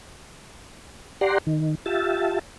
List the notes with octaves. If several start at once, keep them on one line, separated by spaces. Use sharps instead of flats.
G4 D5 F#5 A#5 C6
D#3
F4 G4 E5 A5